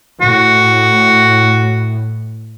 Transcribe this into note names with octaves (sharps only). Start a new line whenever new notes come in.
A2 F#4